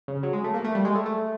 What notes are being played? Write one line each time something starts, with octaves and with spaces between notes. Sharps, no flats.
C#3
F#3
G#3
A3
A#3
A3
G3
G#3
A3
A3